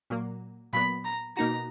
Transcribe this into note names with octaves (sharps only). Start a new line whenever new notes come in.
A#2 F#3 A#3
A#2 F#3 B3 B5
A#5
B2 A#3 D#4 F#4 A#5